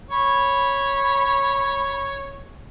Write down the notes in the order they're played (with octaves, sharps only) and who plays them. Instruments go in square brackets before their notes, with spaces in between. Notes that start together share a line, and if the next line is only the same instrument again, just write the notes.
[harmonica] C#5 [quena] B5